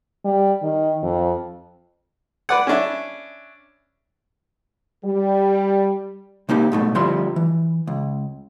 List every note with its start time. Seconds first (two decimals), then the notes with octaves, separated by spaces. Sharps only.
0.25 G3
0.62 D#3
1.03 F2
2.49 B4 D5 F#5
2.67 C#4 D4 E4
5.05 G3
6.49 C3 A#3 D#4 G4
6.72 G#2 B2 A3
6.95 D2 F3 G3 E4 C6
7.36 E3
7.87 C#2